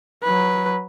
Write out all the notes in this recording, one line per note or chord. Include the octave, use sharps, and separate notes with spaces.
F#3 B4